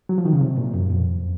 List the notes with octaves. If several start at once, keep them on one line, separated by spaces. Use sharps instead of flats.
F#3
F3
D#3
C#3
C3
A#2
F#2
F2